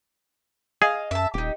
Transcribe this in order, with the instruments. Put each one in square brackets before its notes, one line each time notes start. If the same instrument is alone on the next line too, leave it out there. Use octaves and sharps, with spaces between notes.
[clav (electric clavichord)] G#4 [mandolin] D#5 F5 F6
[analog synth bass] F#2 [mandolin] E5 A5
[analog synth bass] D#1 [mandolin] D#4 G4